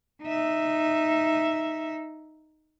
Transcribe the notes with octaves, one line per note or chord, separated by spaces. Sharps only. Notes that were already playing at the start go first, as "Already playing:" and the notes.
D#4 E5